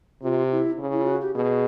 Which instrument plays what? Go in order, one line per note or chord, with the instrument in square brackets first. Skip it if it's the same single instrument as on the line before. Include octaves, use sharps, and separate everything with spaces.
[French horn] C3 [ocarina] F4
[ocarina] E4
[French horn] C#3
[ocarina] E4
F4
F#4
G4
[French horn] B2 [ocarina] G#4